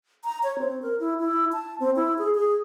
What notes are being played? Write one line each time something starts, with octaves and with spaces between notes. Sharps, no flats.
A#5
C#5
C4
A#4
E4
E4
A5
C4
E4
G#4
G#4